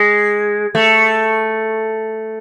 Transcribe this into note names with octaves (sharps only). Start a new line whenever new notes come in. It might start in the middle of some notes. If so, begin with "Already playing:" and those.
Already playing: G#3
A3